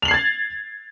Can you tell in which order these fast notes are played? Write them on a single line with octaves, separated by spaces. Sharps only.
F7 F#7 C7 G#6 A6